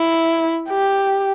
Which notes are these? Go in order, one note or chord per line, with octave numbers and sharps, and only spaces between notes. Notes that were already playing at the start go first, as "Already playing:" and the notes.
Already playing: E4
G4